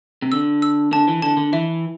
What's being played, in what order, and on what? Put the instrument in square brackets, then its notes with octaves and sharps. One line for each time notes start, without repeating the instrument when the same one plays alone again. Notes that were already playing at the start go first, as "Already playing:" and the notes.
[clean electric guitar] C3
[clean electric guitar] D3 [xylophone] E6
[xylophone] E6
[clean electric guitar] D3 [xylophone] A5
[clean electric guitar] E3
[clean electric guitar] D3 [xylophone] A5
[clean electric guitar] D3
[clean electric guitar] E3 [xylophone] E5